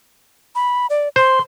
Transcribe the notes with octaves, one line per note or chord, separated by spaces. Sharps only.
B5
D5
C5 C6